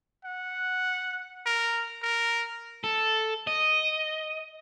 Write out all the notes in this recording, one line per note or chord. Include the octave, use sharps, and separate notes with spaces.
F#5
A#4
A#4
A4
D#5